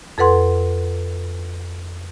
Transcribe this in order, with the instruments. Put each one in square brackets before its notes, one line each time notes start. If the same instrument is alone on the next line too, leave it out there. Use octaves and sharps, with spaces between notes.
[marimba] F2 A4 B4 F#5 C6